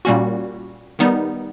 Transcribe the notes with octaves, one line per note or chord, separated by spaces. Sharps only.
A#2 G3 A#3 C#4 F#4
D#3 G3 B3 D#4